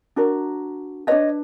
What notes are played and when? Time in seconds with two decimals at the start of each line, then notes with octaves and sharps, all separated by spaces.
0.16 D4 F#4 A#4
1.07 D4 F#4 B4 C#5 D#5